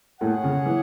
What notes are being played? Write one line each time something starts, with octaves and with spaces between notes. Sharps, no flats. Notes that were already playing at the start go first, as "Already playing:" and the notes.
A2 C#4 G#4 C#5 F#5
C#3
E3